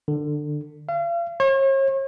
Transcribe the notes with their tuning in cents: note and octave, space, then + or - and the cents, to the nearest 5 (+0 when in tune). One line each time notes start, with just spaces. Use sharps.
D3 +20
F5 -40
C#5 -40